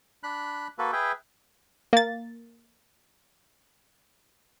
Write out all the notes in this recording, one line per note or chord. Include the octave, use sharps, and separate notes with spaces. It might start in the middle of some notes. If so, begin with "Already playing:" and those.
D4 B5 F#6
A#3 F#4 A4 B4
G#4 B4 E5 G5
A#3 A6